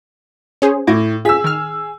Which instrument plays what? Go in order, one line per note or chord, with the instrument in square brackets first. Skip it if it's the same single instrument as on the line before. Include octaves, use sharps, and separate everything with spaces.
[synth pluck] C#4 G#4 C5
[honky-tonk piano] A2 [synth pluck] D6 G#6 A#6
[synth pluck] F4 B6 [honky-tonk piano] G#4 E6
[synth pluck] D#3 F6